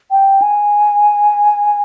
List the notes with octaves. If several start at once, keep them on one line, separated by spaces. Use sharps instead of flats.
G5
G#5